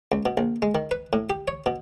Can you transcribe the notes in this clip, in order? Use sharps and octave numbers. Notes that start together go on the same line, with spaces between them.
C#2
B2
A#1
G#3
D#3
B4
A2
G4
C#5
B2